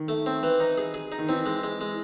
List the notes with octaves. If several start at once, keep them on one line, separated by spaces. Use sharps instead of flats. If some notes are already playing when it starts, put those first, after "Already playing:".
Already playing: D#3
A3
C4
E3
D#4
G#4
G#4
D#4
D#3
E3 C4
G#3
G#3
G#3